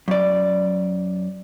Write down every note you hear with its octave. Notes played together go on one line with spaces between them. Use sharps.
F#2 D5